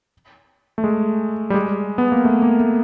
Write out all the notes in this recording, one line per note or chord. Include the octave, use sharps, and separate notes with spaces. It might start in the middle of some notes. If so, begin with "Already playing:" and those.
A3
G#3
G3
G#3
B3
A#3
A3
A#3
A3